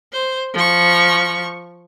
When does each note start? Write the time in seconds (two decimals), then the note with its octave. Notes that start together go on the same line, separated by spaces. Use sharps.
0.13 C5
0.54 F3 C#6